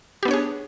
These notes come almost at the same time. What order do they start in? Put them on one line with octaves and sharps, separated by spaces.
G4 B3 D4 C#5 G#4